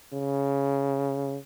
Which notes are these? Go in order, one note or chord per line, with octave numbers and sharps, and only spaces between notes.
C#3